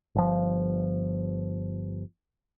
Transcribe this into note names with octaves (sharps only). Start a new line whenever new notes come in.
G1 F3